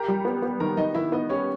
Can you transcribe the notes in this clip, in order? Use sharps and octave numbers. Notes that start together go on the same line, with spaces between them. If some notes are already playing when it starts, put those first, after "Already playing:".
Already playing: G4 A#4 A#5
G3
B3
B3
D#3 A#4 A#5
D#3 D#4 D#5
D#3 E4 E5
B3 D#4 D#5
C#4 G4 C#5